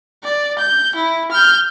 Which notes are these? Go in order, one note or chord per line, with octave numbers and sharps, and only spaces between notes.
D5
G6
E4
F6 G6